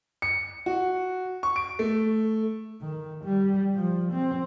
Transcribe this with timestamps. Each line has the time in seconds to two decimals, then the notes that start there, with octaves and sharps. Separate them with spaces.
0.22 C#7
0.66 F#4
1.43 C#6
1.56 D7
1.79 A3
2.81 D#3
3.24 G3
3.75 F3
4.13 C4